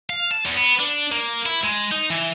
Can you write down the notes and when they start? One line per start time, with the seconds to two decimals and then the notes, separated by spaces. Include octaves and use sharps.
0.10 F5
0.31 A5
0.46 E2
0.58 B3
0.80 D4
1.12 A#3
1.46 E4
1.64 G#3
1.92 D#4
2.10 E3